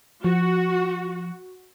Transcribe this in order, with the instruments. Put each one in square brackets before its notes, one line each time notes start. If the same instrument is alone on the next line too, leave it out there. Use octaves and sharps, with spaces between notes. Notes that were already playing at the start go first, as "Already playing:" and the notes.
[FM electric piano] F3 [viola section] F#4